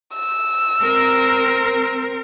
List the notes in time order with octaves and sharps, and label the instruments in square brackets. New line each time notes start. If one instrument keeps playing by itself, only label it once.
[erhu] E6
[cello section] C4 A#4